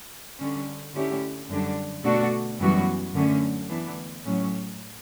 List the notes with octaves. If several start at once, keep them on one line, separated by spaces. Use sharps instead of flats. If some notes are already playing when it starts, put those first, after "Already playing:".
D3 G3 C#4
D3 A3 C#4 E4 G4
F#2 D3 G3 D4
B2 A3 D4 F#4 A4
F#2 E3 G3 B3 F#4
F#2 D3 F#3 A3 C#4
E3 B3 D4
A2 F#3 A3 C#4